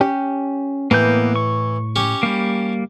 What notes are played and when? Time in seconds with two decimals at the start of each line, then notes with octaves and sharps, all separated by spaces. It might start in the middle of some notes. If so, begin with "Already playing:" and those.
0.01 C#4 G4
0.91 A2 E3 A#3 B3 G6
1.36 C#6
1.96 C#4 G4 C#5
2.23 G3 A#3